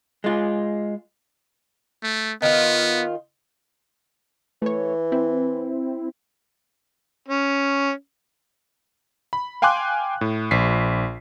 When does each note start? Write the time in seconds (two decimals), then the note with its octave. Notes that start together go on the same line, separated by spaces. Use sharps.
0.24 G#3 F4
2.03 A3
2.42 D#3 B3 F4
4.62 E3 A3 C#5
5.12 C4 E4
7.28 C#4
9.33 B5
9.62 F5 G5 G#5 C6 D6 F#6
10.21 A2
10.51 A#1 B6 C7